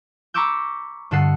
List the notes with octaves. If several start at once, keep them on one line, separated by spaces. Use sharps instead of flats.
A#5 B5 C#6 D6 E6 G6
G2 D3 A4 D#5 F#5 C7